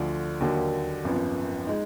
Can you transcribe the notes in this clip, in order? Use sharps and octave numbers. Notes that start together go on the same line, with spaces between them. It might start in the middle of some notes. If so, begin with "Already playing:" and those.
Already playing: D2 D3 F3
D#2 D3 F#3 A#3
G#1 F#2 F3 B3
G#3 D#4